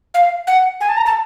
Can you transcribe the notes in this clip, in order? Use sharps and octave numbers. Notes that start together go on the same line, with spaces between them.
F5
F#5
G#5
A5
A#5
A5